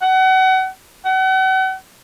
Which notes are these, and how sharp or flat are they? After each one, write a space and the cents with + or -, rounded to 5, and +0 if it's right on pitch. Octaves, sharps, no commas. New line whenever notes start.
F#5 +30
F#5 +40